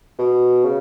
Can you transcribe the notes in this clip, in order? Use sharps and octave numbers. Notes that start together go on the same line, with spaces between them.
B2
C#3